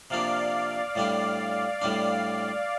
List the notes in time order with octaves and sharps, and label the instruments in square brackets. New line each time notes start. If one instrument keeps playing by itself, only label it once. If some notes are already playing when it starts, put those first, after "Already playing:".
[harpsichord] C3 F3 A#3 D4 [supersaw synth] D5 F5
[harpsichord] A2 G3 D4
A2 G3 D4